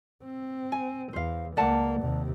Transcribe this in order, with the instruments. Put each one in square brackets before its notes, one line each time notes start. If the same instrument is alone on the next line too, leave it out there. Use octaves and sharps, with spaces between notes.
[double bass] C4
[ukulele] G#5
[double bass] E2 [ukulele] C5 F5
[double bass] C#2 A#3 [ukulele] D5 F#5 A5
[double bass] D#2 C3